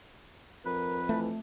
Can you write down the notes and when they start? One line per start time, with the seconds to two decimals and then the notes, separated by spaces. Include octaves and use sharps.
0.65 F2 A#4 B4
1.09 E3 A3